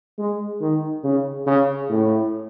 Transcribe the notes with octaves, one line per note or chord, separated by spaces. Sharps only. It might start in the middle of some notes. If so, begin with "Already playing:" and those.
G#3
D#3
C#3
C#3
A2